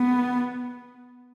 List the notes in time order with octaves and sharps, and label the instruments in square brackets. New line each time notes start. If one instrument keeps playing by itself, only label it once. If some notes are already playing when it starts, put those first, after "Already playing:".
Already playing: [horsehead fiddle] B3